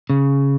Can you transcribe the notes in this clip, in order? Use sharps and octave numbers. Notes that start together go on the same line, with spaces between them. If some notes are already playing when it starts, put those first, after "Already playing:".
C#3